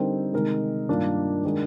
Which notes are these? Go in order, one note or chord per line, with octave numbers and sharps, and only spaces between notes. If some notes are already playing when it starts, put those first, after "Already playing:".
Already playing: D3 G3 C4 D#4 A#4
C3 D#3 G#3 D#4 A#4
G2 D#3 A#3 D4 F4
D#3 G#3 D4 G#4